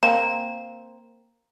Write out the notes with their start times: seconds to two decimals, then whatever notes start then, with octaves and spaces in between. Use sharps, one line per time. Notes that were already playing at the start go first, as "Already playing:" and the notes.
0.03 A#3 C4 A#5